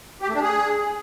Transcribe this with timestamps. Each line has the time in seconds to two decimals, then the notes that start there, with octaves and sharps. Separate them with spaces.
0.22 G4
0.28 A3
0.35 D4
0.42 G#4